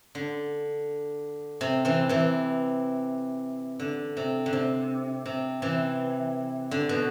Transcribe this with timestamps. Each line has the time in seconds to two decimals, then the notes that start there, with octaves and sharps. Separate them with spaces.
0.15 D3
1.61 C3
1.85 C3 E3
2.09 C3 E3
3.80 D3
4.17 C3
4.46 D3
4.53 C3
5.26 C3
5.62 C3 E3
6.71 D3
6.89 B2